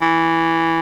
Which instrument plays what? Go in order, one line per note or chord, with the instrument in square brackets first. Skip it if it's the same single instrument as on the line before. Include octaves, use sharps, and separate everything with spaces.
[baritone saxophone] E3